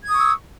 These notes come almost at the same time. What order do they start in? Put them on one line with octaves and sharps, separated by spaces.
G#6 D#6 C#6 E6